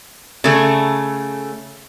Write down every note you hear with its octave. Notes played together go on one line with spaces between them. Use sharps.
C#3 A3